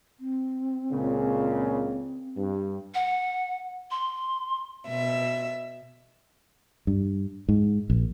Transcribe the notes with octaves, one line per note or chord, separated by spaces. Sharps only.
C4
C#2 A#2 C#3
G2
F#5
C6
B2 E5
G2
G#2
A#1